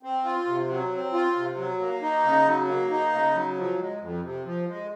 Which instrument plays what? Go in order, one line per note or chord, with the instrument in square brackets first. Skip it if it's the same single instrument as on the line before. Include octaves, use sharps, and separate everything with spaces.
[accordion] C4
F4
C3
F#3
C4
F4
C3
F#3
A#3
D#4
C#3
F#3
A#3
D#4
C#3
F#3
F3
G#3
F2
C3
F3
G#3